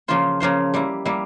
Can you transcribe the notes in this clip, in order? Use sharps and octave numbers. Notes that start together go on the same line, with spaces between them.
C#3 F3 A#3 F4 C5
C#3 F3 A#3 F4 C5
G3 A#3 E4
G3 A#3 E4